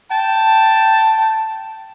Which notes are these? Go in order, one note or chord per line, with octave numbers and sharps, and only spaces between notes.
G5 A5